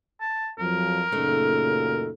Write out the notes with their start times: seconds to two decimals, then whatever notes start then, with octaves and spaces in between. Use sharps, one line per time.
0.21 A5
0.59 F2 F3 F#3 A#4
1.12 F#2 A#2 C#3 A3 D#4